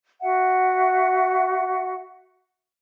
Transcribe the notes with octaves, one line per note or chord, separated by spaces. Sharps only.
F#4 E5 F#5